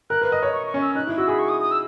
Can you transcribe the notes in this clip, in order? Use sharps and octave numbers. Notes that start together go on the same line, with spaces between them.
A#4 F#6
B4
D#5
C#5
C#6
C#6
C#4
E6
D#4 F#6
E4
F#4 E6
G#4 B5
C#6
D#6
D#6
E6